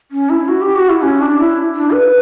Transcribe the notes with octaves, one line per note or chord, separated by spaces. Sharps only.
C#4
E4
F#4
G4
F#4
E4
C#4
D4
E4
D4
B4